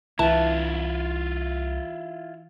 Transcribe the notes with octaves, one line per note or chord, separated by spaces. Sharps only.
C2 E3 E4 F4 A5